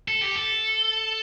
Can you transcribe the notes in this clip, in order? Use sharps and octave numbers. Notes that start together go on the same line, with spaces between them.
A4
G4
A4